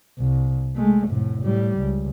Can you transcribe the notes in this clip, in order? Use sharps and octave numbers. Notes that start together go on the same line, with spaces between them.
C2
G#3 A3
F1 A2
A2 G3
C#2